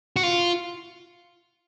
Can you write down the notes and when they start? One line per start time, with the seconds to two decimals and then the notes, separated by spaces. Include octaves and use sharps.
0.16 F#4
0.23 F4